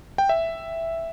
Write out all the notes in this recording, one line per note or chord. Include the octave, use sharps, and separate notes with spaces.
G5
E5